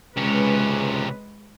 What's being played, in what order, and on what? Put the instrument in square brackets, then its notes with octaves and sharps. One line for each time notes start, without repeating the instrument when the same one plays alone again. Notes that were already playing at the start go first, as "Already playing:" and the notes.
[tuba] C#2 [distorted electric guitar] C3 C#4 [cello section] G#3 B4